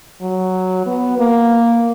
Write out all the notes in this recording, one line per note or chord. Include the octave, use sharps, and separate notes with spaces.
F#3
B3
A#3